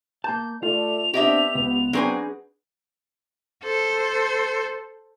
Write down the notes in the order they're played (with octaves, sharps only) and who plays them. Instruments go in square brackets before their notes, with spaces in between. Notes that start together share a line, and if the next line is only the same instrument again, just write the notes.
[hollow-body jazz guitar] A#3 A5 [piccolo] G6
[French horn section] A3 D5 [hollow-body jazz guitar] F4 [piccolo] F7
[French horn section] B3 C4 D4 [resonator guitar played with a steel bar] G4 D#5 E5
[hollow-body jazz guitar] C#2 [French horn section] B3
[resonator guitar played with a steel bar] F#3 C4 G#5 [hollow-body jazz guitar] D4 G#4 B4
[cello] A4 C5